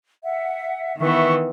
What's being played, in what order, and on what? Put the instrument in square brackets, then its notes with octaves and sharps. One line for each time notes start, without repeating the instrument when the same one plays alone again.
[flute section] E5 F#5
[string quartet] D#3 E3 B3 [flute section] E5 C#6